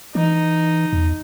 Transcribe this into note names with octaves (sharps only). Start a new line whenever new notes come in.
E3 D#4
E2